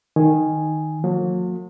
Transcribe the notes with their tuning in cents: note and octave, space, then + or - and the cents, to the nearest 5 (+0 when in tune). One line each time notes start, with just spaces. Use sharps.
D#3 +0 G#5 +0
F#3 -45 A#3 -40